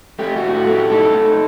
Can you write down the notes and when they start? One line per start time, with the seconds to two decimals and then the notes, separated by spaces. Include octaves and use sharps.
0.19 A3 G4
0.36 F#4
0.43 A2
0.55 F#4
0.67 A3
0.72 G4
0.90 D#4 A4
1.13 A3